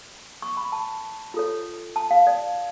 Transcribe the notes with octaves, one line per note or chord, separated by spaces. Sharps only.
C#6
B5
A5
F4 A4 C#5
A5
F5
D5